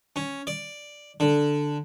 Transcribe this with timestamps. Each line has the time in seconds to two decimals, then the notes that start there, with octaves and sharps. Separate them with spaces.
0.16 C#4
0.47 D5
1.20 D3